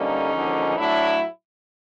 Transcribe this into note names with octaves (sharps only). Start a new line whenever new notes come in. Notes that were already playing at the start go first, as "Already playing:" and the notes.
Already playing: F2 D3 G3 A#3 C#4 D#4
D#2 D3 F3 G#3
A2 F#3 A3 D4 E4